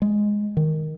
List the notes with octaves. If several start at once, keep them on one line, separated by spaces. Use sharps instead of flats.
G#3
D#3